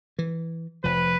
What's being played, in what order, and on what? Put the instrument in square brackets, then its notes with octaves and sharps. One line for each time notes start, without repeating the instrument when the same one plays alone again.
[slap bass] E3
[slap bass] F1 F3 [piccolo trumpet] B4